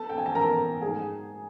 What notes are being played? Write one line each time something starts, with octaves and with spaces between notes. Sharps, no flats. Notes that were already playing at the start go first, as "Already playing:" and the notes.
Already playing: B3 A4 A5
G5
G#5
A5
B3 A#4 A#5
G#2 G#4 G#5